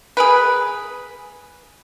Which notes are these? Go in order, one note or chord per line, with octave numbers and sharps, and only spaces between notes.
G#4 A#4 B4